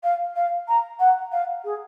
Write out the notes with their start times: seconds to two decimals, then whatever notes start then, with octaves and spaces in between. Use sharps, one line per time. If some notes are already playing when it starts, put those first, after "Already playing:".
0.03 F5
0.35 F5
0.68 A#5
0.99 F#5
1.32 F5
1.64 G#4